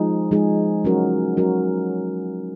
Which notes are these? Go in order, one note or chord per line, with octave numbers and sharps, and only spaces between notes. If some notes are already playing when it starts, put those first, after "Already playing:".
Already playing: F3 G#3 D#4 G#4
F3 G#3 D#4 G#4
F#3 C#4 F#4 A#4
F#3 C#4 F#4 A#4